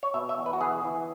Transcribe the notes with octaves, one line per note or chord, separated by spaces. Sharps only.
C#5
B2 E5
E5
E2
B4
F#4
E3 G#4
E3